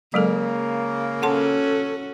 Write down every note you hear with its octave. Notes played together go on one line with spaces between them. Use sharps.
C#3 F#3 G#3 A#3 A4
C#4 F#4 A4 F#5 A5 C6